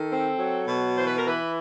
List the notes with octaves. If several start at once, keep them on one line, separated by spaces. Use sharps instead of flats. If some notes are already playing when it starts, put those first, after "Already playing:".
Already playing: D#3 A4
C4
F#3
B2
E3 C5
B4
A#4
E3 B4